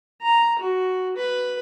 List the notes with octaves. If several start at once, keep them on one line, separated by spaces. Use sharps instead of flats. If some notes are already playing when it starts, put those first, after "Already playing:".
A#5
F#4
B4